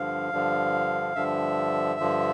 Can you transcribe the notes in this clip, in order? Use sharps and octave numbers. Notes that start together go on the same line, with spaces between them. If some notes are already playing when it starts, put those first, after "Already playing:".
Already playing: G2 D3 F3 F5
G2 D3 F3
G2 D3 F3 E5
G2 D3 F3